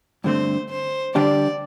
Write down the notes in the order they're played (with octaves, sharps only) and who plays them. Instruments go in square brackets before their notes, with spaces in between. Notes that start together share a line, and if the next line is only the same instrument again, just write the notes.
[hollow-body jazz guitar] G2 D3 A3 C4 [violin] C5
[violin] C5
[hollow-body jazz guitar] D3 G3 D4 G4 [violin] D5